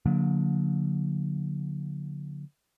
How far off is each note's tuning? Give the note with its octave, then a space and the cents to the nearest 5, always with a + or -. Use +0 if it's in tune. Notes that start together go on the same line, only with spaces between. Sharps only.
D3 -20 F#3 -45 A#3 -10